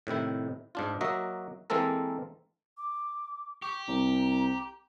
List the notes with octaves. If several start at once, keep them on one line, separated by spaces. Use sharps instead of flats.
A2 C3 D#3 E4
G#2 D4 F4
F#3 A#3 F#4 D#5 E5
E3 G#3 A#3 C4 A4 A#4
D6
G4 C#6
C2 A#5